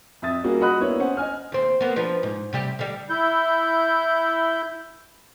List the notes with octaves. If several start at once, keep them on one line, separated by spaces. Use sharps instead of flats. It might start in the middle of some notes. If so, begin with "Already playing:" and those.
F2 E5 D#6 A6
G3 A#3 C#4 F#4 G#4
F#4 D#5 F#5 B5 D#6 F#6
A#3 B3 D4 E4 C#5
C#4 C5 F#5
D#5 G#5 F6
D#2 C4
A#3 B3
F3 D4 B4
G#2
C3 G3 G4
D3 G3
E4 G6